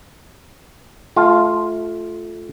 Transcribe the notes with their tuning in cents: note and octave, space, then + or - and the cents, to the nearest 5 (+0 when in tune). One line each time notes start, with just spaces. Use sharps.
A3 -20 F4 +0